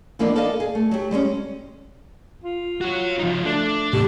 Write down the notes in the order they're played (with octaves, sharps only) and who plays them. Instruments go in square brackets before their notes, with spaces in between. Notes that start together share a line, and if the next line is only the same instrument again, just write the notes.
[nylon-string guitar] E3 F3 A#3 B3 D4 D#4
A4 A#4 D5 D#5 F5
G#4
A3
F#3 G4
G3 G#3 C4 C#4
[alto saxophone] F4
[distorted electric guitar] F#4 C#5
F3 D#4
[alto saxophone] A3 [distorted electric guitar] D4
[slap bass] A2 C3 E3 [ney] G4